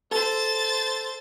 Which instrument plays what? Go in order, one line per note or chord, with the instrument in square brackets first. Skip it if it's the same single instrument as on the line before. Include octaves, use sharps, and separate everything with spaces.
[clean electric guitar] A4 A5 [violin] C5 A6